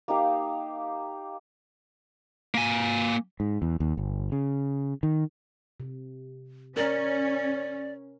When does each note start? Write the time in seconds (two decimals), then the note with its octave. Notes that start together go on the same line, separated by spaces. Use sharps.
0.08 A#3 D#4 G4 F5
2.55 A#3 G#5
3.40 G#2
3.62 E2
3.80 D#2
3.97 G1
4.32 C#3
5.03 D#3
5.80 C3
6.77 C#4 A#4 D5